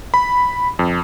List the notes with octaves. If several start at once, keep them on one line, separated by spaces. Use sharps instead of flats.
B5
F2